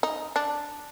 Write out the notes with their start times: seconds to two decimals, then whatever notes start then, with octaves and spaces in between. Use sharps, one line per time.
0.03 D#4
0.36 D4